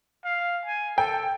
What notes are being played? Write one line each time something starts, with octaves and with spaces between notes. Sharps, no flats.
F5
G#5
A4 G5